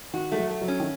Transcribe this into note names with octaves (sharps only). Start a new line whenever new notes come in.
D#3 F#4
G#3 A3
F#3
A3
F#3
C#4
D#3